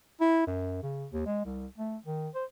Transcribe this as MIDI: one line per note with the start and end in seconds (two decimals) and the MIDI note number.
0.21 0.44 64
0.47 0.81 42
0.83 1.07 49
1.12 1.23 39
1.26 1.42 56
1.45 1.66 36
1.78 1.97 57
2.06 2.28 51
2.35 2.44 72